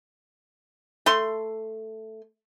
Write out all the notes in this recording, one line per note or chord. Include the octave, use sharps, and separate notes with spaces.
A3 C6